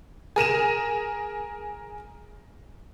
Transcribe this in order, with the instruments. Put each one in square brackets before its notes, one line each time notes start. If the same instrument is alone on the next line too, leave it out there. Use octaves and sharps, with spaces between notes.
[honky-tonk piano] G#4 A#4 D#7 E7